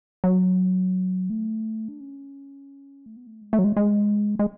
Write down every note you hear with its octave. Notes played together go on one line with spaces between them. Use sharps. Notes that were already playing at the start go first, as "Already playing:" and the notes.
F#3
A3
D4
C#4
A3
B3
A3
G#3
A3
F#3
G#3
G#3
G#3